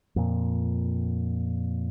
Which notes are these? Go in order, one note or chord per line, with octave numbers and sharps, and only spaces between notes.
F2 A#2